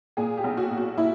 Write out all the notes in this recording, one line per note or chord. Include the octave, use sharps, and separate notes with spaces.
A#2 G#4
G4
B1
F#4
A#2
F#4
A#2 E4